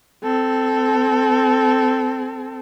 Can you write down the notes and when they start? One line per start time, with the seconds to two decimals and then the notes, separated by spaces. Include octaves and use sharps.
0.23 C4 A4